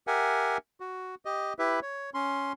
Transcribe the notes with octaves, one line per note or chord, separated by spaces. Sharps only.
G4 A#4 E5 F#5 G#5
F#4
G4 D#5
E4 G4 B4 E5
C#5
C#4 C6